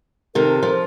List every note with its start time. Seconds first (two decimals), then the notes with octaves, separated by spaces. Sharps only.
0.35 C3 D#3 A4 A#4
0.63 F3